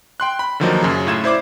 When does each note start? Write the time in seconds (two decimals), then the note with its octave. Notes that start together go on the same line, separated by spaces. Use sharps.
0.20 G5 C6 F#6
0.39 B5
0.60 D3 D#3 F3 F#3 A#3 D#4
0.82 F#2 C#3
1.07 A2 F4 G#6 E7
1.24 E4 C5 D5 D6